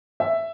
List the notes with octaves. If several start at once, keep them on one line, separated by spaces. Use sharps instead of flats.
E5